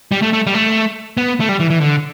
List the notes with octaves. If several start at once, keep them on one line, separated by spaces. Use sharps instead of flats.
G3
A3
A3
G3
A3
B3
A3
G3
E3
E3
D3